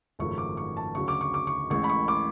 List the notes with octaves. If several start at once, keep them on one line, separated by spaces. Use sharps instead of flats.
G#1 F#2 C#3 F3 A3 C#6
D6
C#6
A5
D2 C#3 F#3 C#6
D6
C#6
D6
C#6
A1 A2 G#3 C#6
B5
C#6
D6